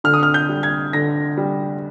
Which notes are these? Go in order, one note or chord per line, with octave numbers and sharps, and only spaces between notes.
D3 F6
D#6
F6
G6
G3
G#6
D3 A#6
G3